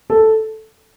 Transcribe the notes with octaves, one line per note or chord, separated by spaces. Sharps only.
A4